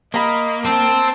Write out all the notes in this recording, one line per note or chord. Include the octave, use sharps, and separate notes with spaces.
A#3 D#5 A#5 B5
C4 A5